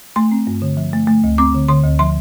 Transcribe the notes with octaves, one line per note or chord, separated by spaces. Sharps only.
A3 C6
C4
G2
D3
F3
A3
A3
D2
C4 D6
D3
D3 C6
D2
F3 C6